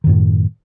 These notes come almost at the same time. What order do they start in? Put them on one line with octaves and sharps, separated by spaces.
D#3 F#2 A2